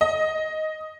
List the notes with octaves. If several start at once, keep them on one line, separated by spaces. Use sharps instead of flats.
D#5